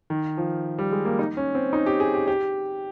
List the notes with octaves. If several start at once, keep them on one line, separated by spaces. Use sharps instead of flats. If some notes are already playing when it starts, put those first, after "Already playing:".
D#3
F3
G3
G#3
A#3
D#4
C#4
C4
D#4
G4
G#4
G4
G4